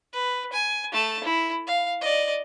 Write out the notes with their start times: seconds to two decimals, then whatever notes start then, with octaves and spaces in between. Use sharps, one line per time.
0.13 B4
0.53 G#5
0.92 A3 A5
1.24 E4
1.67 F5
2.01 D5 D#5